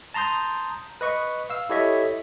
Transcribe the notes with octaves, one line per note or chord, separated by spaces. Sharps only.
A5 A#5 C6 D#6 G6
B4 D#5 C#6
F5 E6
E4 G4 A4 C#5 D#5 E5